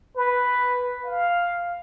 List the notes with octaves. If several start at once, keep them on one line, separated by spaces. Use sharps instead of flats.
B4
F5